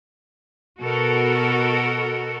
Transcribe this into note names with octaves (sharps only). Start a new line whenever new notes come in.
B2 F#4 A4 A#4